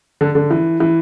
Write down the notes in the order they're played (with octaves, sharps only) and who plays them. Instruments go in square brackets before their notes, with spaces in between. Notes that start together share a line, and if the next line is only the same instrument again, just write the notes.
[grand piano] D3
D3
E3
E3